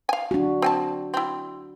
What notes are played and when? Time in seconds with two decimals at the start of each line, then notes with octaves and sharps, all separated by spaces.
0.09 F5 G#5
0.31 D4 F#4
0.62 C4 G#5 A5
1.14 C4 E4